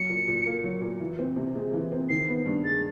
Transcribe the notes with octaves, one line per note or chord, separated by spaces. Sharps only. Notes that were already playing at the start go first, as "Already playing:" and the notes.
Already playing: F#3 C#7
A#2
A#2
A#3
F#3
A#2
E3
C4
C3
G#3
E3
C4
D#3 C7
B3
G2
G#3 A6